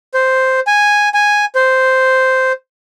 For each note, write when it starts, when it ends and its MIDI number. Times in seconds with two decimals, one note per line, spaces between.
0.14 0.60 72
0.67 1.09 80
1.14 1.45 80
1.55 2.52 72